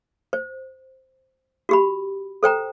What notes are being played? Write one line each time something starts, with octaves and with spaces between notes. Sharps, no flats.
C5
F#4 G4 B5
A4 C5 G5 A#5